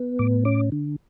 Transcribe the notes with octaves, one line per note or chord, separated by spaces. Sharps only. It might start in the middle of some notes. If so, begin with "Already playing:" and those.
Already playing: B3
A2 D6
C#4 D6
D3